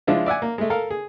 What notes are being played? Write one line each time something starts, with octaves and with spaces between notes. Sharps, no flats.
F3 G#3 D4 E4 F4
D5 E5 F#5 G#5
A#3
G#3 A3
A4 A#4 F5
G#4